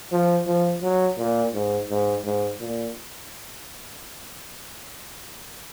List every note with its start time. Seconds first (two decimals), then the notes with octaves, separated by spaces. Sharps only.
0.12 F3
0.47 F3
0.82 F#3
1.18 A#2
1.54 G#2
1.89 G#2
2.25 G#2
2.60 A#2